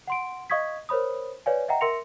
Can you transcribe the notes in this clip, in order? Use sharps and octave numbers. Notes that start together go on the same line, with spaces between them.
F#5 C6 D7
D#5 F5 C#6 D#6 G#6 B6
A#4 C5 C#5 B5 D#6
B4 C#5 D5 F5 G#5
D#5 E5 F#5 G5 A#5
A#4 E5 C6 A#6 C#7 F7